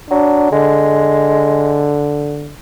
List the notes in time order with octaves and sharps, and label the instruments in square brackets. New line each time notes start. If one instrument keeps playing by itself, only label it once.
[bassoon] F#3 [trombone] D4
[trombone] D3 [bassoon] G#3